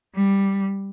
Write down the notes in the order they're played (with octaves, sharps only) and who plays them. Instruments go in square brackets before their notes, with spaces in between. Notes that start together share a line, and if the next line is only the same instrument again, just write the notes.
[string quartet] G3